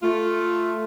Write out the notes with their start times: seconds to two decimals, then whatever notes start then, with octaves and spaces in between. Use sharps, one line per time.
0.03 A3 F4